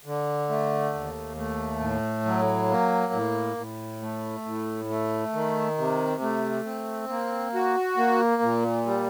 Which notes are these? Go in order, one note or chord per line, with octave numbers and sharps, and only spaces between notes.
D3
A3
D#2
A3
A2
F#3
A#3
A2
A2
A3
A2
A3
D#3
C3
A3
C4
A#3
F#4
A#3
A#2
G3